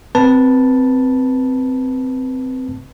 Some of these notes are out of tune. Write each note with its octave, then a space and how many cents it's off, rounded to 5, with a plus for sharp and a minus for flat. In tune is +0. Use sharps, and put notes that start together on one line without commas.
C4 -15 B4 -20 A5 +0